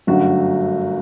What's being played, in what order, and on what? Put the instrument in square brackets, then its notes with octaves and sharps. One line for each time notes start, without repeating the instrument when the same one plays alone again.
[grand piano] G1 F#2 D3 A3 F#4